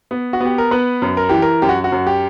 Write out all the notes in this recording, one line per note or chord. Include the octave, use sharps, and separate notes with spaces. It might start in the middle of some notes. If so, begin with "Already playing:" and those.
B3
F#4
B3 G4
A#4
B3 B4
F#2
A#4
E3 G4
A#4
F#2 G4
F#4
F#4
F#2
G4